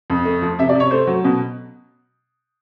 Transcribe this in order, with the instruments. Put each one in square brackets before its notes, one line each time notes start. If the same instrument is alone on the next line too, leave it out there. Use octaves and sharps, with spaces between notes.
[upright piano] F2
A3
F3
C3 E5
D5
C3 C#5
A3 C5
F#3
B2